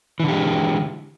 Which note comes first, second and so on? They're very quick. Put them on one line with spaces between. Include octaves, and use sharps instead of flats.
E3 D3 G4 G#3